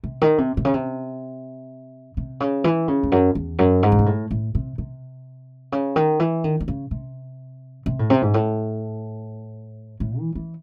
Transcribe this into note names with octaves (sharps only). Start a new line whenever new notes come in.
C3
D#3
C3
C3
C#3
C3
C3
C#3
E3
C#3
E2
F#2
E2
F#2
G#2
C#3
C3
A2
A2
C3
C3
C#3
D#3
E3
D#3
D#3
C#3
C3
C3
A2
C3
G#2
A2
A2
E3
E3